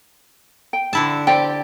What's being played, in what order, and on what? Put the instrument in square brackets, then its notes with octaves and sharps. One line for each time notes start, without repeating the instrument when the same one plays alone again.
[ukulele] G5
[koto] D3 E4 A5
[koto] G4 [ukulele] C5 D5 G5